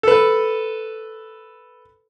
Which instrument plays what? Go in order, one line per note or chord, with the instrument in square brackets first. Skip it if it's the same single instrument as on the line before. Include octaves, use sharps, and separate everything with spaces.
[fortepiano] A4 B4